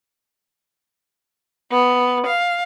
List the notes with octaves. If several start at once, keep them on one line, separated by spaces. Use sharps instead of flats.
B3
F5